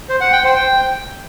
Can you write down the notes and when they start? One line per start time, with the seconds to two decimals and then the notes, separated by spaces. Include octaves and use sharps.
0.09 C5
0.21 F#5
0.32 G5
0.44 C5
0.56 G5